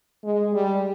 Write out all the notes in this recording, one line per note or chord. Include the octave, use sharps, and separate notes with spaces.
G#3
G3